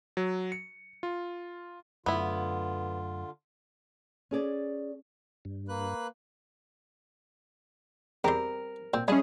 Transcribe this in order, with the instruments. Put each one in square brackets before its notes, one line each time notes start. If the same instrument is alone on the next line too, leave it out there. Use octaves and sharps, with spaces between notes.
[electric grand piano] F#3
C#7
F4
[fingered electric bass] F#2 F#3 A3 [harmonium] D3 F4 [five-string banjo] B3 E4
[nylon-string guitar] C#4 G#4 D5
[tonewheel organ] G2
[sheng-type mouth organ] A#3 B4 F#6
[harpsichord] E2 C6 [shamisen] G3 C4 G4 [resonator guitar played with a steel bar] A#4
[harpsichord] A#2 [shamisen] C4
[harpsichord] G3 D#5 [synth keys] C#4 G#4 [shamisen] D4 E4